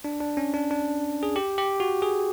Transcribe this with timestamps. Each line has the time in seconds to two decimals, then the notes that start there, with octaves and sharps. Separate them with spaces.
0.04 D4
0.21 D4
0.37 C#4
0.54 D4
0.71 D4
1.23 G#4
1.36 G4
1.58 G4
1.80 F#4
2.02 G#4